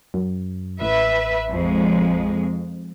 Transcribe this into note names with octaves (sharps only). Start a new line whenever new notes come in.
F#2
A1 B4 E5
F2 G#3